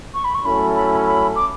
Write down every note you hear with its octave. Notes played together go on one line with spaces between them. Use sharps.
C#6
B5
C#6
F#3 A3 C#4 E4 A4 B5
B5
B5
D6